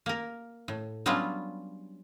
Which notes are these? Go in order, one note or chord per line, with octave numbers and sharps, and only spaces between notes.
A#3 A#4
A2
F#3 G3 B3 C#4 D4 F4